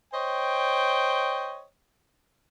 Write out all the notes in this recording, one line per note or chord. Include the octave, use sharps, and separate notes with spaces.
C5 C#5 D#5 G5